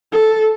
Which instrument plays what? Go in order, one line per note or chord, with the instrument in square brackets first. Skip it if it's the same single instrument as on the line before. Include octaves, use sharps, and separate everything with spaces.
[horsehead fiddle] A4